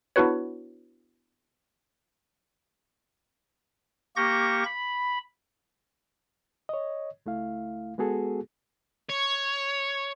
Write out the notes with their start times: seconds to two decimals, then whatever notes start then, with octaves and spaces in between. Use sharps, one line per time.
0.16 B3 D4 E4 F#4 B4 C#5
4.16 A#3 G4 C#6 G6 A#6
4.66 B5
6.69 C#5 D#5
7.26 C#2 A3 E4 F5
7.98 G#3 B3 F#4 G#4 A4
9.10 C#5